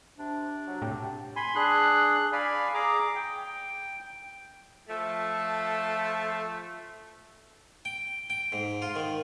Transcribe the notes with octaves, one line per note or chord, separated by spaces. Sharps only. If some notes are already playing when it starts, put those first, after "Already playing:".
C3 D4
F#3
A2 C3 G4
G#5 B5 C6
D4 G#4 F#6
D5 F5 G#5 B5
G#4 A#5 D6
G5
F3 A3
G5
G5
G#2
F4
D#3